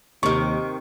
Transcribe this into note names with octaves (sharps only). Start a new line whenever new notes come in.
D#2 C3 D#3 C#6